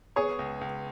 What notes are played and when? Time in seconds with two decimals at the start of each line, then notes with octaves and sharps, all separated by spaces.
0.16 B3 G#4 C#5
0.39 C#2
0.61 C#2